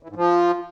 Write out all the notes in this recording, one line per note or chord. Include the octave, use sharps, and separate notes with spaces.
E3
G#2
F3